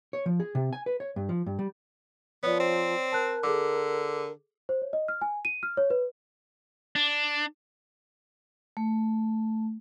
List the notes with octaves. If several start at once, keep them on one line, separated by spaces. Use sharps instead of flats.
C#5
F3
G#4
C3
G#5
B4
C#5
G2
F3
G2
G3
F3 B3 C#5 D5
C4
A#4 A5 F#6
D3 G#4 A4 D6
C5
C#5
D#5
F6
G#5
D#7
F6
C#5
B4
D4
A3